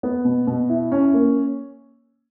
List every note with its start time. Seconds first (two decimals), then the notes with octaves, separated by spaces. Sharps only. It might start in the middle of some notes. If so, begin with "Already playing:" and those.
0.03 B3
0.25 B2
0.47 B2
0.69 E4
0.92 C#4
1.13 A#3